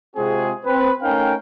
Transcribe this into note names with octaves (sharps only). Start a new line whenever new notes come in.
C3 G#3 C4 F4 F#4 G#4
C4 B4
A3 C#4 D#4 A#4 F5 G5